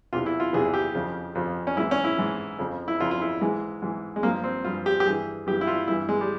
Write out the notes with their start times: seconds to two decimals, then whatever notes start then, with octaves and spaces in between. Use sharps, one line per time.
0.13 E2 C3 E3 F4
0.26 E4
0.40 F4
0.53 E2 C3 E3 G#4
0.74 G4
0.95 F2 C#3 F3
1.35 F2 C#3 F3
1.67 C#4
1.77 G#2 E3 E4
1.91 C#4
2.04 E4
2.18 G#2 E3
2.59 F2 C#3 F3
2.88 E4
3.00 F2 C#3 F3 F4
3.11 F4
3.21 E4
3.41 G#2 E3 G#3
3.82 G#2 E3
4.16 G#3
4.23 G2 A#3
4.27 F3
4.44 C4
4.64 G2 F3 F4
4.86 G4
5.00 G4
5.05 G2 E3 G#4
5.46 G2 G4
5.50 E3
5.61 E4
5.67 F4
5.88 G2 E3 E4
6.09 G#3
6.21 G3